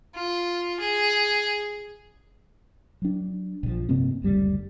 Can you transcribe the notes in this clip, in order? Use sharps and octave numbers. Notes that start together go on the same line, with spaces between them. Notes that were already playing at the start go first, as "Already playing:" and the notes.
F4
G#4
F#3 D4
A#1 F3
G2 C3 A#3 C4
F#1 D2 G3